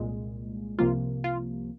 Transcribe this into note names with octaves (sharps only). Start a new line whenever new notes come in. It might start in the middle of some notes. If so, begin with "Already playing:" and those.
Already playing: C2 A#2 G#3
C2 C3 F3 A#3 F4
F4